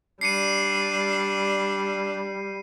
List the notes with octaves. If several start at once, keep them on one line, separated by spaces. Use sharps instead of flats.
G3 D4 C7 C#7 D#7